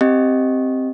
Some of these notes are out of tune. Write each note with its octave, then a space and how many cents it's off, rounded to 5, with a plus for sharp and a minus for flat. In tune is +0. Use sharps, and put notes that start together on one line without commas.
C4 +0 G4 +0 D#5 +0